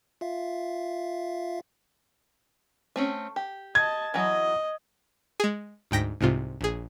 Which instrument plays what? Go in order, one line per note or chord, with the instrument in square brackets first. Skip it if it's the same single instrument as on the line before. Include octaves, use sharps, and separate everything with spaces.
[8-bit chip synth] F4 E5 F5
[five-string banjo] A3 C4 C#4
G4
[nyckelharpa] D#5 A5 [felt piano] G#6
[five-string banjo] E3 F#3 [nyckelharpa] D#5
[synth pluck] G#3 G#4
D2 G#2 G5 A#6 B6
C2 G#2 C3 F4
A#1 G#4